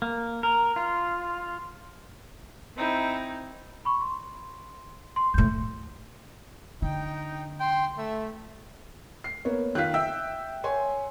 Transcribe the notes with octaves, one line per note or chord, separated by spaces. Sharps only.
A#3
A#4
F4
C4 D#4 E4
B5 C#6
C6
C6
F2 A2 G6
D3 D#4 G5
G5 C6
A3 E5
C7
A#3 B3 C#5
D#3 F4 F#6 B6
E5 G5 E6
C#5 G#5 C6